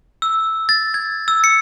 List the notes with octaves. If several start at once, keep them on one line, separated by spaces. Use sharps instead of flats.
E6
A6
G#6
E6
C#7